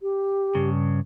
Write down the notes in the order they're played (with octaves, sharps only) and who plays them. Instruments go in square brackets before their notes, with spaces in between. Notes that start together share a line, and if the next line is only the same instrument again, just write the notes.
[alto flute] G4
[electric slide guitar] G2 C#3